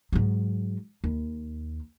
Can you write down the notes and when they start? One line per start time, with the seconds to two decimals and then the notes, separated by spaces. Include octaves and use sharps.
0.12 G#2 F#3
1.04 D#2